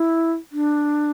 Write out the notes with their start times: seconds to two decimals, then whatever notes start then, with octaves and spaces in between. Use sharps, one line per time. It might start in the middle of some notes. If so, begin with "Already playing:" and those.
Already playing: E4
0.52 D4